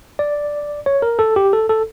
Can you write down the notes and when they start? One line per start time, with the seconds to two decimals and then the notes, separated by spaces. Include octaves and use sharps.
0.19 D5
0.86 C#5
1.02 A#4
1.19 A4
1.36 G4
1.53 A4
1.69 A4